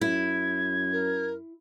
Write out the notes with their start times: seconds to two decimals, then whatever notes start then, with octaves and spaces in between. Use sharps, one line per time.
0.01 F#2 E4 G#6
0.92 A#4